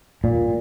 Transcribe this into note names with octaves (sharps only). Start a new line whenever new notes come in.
A#2